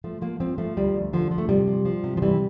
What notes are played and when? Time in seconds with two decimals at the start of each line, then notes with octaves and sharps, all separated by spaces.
0.04 F3 A3
0.21 F3 A#3
0.40 F3 C4
0.58 F3 A3
0.77 D2 G3
0.95 D2
1.13 D3 F3
1.31 F3
1.38 A3
1.49 C3 G3
1.67 F3
1.85 F3
2.04 C3
2.17 F3
2.22 E3 G3